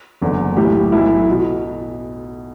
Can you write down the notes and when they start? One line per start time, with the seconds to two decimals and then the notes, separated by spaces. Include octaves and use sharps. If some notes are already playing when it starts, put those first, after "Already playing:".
0.22 F#1 E2 D3
0.57 B1 A2 E3 G4
0.92 B1 A2 E3 E4
1.31 B2